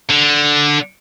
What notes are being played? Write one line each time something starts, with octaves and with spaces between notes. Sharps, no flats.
D3